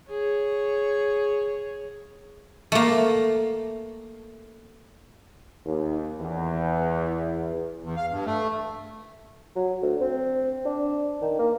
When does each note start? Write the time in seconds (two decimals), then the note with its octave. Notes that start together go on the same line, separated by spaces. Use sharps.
0.10 G#4 C#5
2.72 A3 A#3
5.66 D#2
6.20 E2
7.83 E2
7.97 F5
8.10 G2
8.26 A3
9.56 F#3
9.82 D2
10.01 C4
10.65 D4
11.22 D#3
11.39 A#3